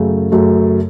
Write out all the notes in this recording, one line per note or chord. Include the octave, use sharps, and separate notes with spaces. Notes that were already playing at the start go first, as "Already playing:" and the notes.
Already playing: F#2 C#3 F#3 A3
F#2 C#3 F#3 A3